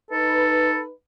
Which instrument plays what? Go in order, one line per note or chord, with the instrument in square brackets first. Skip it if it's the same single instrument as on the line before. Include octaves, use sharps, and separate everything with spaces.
[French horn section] D#4 B4 [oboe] A4